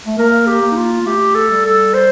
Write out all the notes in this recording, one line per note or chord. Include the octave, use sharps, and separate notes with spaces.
A3
A#3 A#4
G4
A#3
D#4
F4
A#3
A3 G4
A4
G3
A4
C5